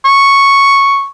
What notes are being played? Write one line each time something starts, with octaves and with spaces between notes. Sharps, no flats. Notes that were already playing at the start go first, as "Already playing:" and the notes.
C#6